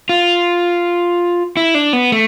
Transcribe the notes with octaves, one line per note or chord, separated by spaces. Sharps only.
F4
E4
D4
B3
A3